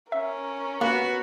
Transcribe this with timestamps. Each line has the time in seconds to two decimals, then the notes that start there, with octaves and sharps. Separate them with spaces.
0.12 C#4 A#4 E5
0.81 A#3 B3 F#4